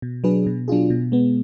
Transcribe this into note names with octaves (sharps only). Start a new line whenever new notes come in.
B2
F#3 D4 G#4 B4
B2
F#3 D4 F4 G#4
B2
G#3 B3